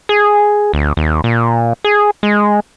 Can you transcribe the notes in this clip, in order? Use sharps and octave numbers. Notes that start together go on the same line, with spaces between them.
G#4
D2
D#2
A#2
G#4
G#3